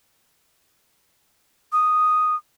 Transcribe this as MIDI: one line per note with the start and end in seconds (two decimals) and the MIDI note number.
1.73 2.35 87